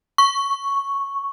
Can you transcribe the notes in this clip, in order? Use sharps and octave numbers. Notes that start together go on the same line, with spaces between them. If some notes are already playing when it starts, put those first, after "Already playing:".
C#6